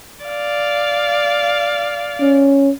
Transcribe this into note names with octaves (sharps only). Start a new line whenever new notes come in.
D5 F5
C#4